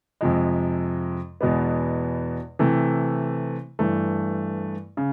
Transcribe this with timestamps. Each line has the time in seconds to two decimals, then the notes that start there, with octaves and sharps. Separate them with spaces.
0.21 F2 C3 F3 G#3
1.41 E2 B2 G#3 B3
2.59 C3 E3 A3
3.79 G2 E3 A3
4.97 C#3